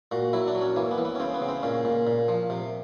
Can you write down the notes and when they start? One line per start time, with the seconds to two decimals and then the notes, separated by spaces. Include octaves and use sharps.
0.11 A#2 F#4
0.33 F#3 E4
0.47 D4
0.55 F#3
0.61 C#4
0.76 E3 A#3
0.91 B3
0.98 E3
1.05 B3
1.15 C#4
1.20 C#3 C4
1.34 B3
1.42 C#3
1.48 C4
1.63 A#2 C#4
1.85 A#2
2.07 A#2
2.28 F3
2.50 C3